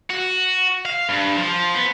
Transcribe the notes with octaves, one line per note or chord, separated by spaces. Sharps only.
F#4
F5
G2
F3
B3